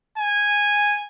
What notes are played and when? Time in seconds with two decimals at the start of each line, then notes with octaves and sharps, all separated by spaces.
0.18 G#5